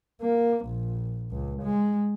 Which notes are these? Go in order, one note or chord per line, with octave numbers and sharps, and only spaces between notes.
A#3
A#1
C#2
G#3